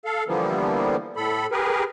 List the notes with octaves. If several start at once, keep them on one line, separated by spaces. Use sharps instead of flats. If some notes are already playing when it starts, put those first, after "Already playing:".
A4 F5
D3 E3 F3 G3 A#3 B3
A2 A4 B5
G4 G#4 A#4 B4